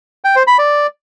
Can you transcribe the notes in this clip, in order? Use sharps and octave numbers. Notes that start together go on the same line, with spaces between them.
G5
C5
B5
D5